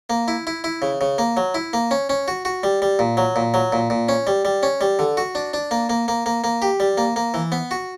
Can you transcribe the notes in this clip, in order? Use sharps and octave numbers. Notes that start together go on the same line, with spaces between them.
A#3
E4
E4
E4
C#3
C#3
A#3
F#3
E4
A#3
C#4
C#4
F#4
F#4
G3
G3
A#2
F#3
A#2
F#3
A#2
A#2
C#4
G3
G3
C#4
G3
D3
F#4
D4
D4
A#3
A#3
A#3
A#3
A#3
G4
G3
A#3
A#3
E3
B3
F#4